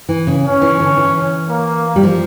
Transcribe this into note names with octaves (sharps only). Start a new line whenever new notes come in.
E3
C#3
C#4
E3
D3
E3
A#3
G3
F3